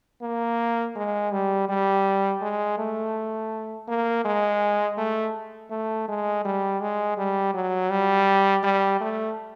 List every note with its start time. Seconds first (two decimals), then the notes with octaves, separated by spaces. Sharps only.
0.22 A#3
0.95 G#3
1.32 G3
1.69 G3
2.41 G#3
2.78 A3
3.88 A#3
4.25 G#3
4.97 A3
5.71 A3
6.08 G#3
6.45 G3
6.81 G#3
7.18 G3
7.54 F#3
7.90 G3
8.64 G3
9.01 A3